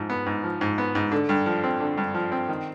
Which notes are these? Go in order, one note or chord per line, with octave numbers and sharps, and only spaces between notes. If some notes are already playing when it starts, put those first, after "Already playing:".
Already playing: G#2 F3
B3
G#2
F3
G#2
B3
G#2
D3
G2
F3
C4
D3
G2
F3
C4
D#3